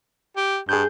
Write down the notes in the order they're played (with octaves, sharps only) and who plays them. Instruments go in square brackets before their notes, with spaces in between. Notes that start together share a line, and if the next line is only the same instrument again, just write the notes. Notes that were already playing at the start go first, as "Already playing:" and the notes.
[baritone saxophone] G4
[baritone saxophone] G2 [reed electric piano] G#4 G6